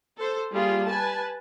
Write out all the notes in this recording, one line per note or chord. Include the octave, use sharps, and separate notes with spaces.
A4 C5
G3 A#3 F4 G#4
B4 G#5 A5